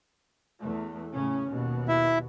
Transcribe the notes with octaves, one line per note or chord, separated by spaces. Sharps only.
E2 A3
A2 C#3 C#4
D#2 B2
E4 E5